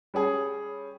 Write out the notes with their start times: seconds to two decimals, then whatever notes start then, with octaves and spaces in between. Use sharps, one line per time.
0.14 G3 C#4 G#4